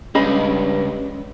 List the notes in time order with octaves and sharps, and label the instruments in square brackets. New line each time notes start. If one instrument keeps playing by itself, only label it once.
[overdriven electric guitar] C#2 [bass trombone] G2 [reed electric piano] C#4 [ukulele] D#5 F5 B5